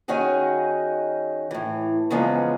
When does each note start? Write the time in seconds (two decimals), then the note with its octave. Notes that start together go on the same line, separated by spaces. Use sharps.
0.08 D#3 C#4 D#4 F#4 G#4
1.51 A2 E3
2.10 E2 C#3 F3 G#3 B3 C#4